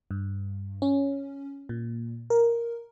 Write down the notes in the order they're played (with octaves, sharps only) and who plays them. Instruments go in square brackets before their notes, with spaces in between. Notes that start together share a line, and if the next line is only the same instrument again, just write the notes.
[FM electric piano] G2
C#4
A#2
A#4